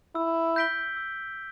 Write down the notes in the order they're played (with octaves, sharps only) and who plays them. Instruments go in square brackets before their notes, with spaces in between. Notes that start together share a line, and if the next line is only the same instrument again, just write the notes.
[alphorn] E4 [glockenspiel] E6
[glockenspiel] G6 B6 D7 G7
E6